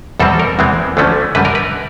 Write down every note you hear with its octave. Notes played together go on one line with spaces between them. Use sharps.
E2 B2 G3 C4 A4
A#4
E2 C3 E3 G#3 C4
D2 D3 F3 A3 C#4
F#2 D3 G3 B4
A#4
B4